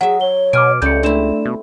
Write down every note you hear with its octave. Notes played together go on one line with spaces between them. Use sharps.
F#3 G#4 E5 F#5
C#5 G7
B2 G#5 D6 F6 D7
C#2 G3 A3 C#4 D5 G6 C#7
A3 C4 D4 E4 D5 E7
B2